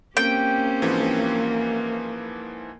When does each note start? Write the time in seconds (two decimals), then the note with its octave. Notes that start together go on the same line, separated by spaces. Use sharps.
0.17 A#3 C4 C#4 G4 G5
0.82 G#2 E3 F3